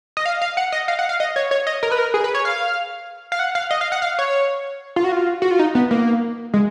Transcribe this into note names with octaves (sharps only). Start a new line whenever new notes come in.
D#5
F5
F5
F#5
D#5
F5
F#5
F5
D#5
C#5
C#5
D#5
A#4
B4
A#4
G#4
B4
C#5
F5
F5
F#5
F5
D#5
F5
F#5
F5
C#5
F4
F#4
F4
F#4
F4
D#4
B3
A#3
G#3